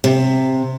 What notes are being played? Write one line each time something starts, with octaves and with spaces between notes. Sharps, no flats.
C3